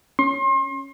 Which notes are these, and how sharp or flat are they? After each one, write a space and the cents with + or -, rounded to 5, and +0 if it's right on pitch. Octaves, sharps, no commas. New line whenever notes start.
C#4 +0 C6 +35